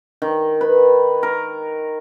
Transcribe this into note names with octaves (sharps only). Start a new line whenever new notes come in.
D#3
B4
A#4